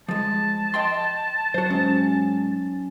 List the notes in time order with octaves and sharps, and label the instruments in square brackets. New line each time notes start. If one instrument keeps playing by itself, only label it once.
[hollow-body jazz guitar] F3 G#3 [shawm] A5
[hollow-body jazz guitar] D#5 G5 C6
[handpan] F#3 [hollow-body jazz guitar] F#4 C5
[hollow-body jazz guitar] G#2 [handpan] C#4